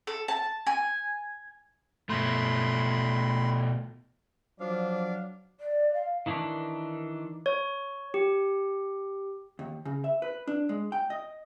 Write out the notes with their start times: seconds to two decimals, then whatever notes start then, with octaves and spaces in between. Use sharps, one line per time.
0.07 A4
0.28 A5
0.66 G#5
2.09 B2 A3 B5 C6
4.60 F3 F#3 D4 D5 F5
5.60 D5
5.94 F5
6.26 D#3 E3 D4
7.46 C#5
8.14 G4
9.59 D#2
9.85 C#3
10.04 E5
10.22 B4
10.47 D4
10.69 G#3
10.92 G5
11.10 D#5